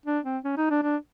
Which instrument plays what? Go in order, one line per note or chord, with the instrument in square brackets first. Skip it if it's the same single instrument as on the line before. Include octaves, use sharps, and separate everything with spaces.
[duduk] D4
C4
C#4
D#4
D4
D4